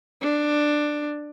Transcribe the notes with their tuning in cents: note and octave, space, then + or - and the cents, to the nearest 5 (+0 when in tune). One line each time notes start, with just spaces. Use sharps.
D4 +10